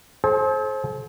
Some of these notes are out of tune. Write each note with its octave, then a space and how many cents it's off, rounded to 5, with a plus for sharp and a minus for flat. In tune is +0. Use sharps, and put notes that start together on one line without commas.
A4 -45 C5 +25